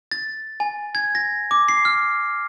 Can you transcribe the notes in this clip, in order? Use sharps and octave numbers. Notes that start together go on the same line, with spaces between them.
A6
G#5
G#6
A#6
D6
C7
F6